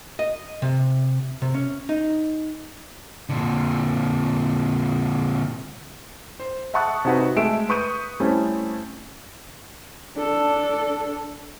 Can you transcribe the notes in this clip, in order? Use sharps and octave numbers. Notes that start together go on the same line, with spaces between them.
D#5
C3
C3
C#4
D#4
A#2 D3
C5
E5 F#5 A5 C#6 D#6 F#6
C3 D#4 F#4 B4
G#3 A3 E5 D7 E7
B4 C#6 D#6 G6 D#7
G3 A3 C4 C#4 E4
D4 A4